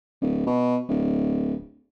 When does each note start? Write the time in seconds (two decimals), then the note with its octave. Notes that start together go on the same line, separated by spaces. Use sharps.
0.22 D1
0.46 B2
0.88 D1